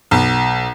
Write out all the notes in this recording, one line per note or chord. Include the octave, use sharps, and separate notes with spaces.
B1